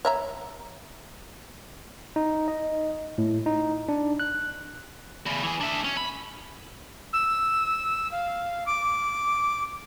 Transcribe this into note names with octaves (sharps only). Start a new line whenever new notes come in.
C#5 E5 A#5
D#4
D#5
A2
D#4
D4
F#6
E2 C#3
E3 G#4
D4 E5
C#4
B5
E6
F5
D6